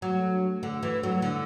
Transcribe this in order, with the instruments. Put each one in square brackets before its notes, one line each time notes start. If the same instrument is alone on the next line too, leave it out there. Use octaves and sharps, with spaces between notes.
[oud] F#3 [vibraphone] A3
[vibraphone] A4
D4
A3
[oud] D3 [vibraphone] A3
[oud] E3 [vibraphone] A4
[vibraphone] D4
[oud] F#3 [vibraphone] A3
[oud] D3 [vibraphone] E4